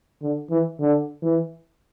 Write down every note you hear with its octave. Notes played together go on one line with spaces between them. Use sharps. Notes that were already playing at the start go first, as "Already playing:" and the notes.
D3
E3
D3
E3